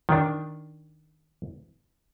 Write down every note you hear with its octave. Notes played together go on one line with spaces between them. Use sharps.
D#3 D4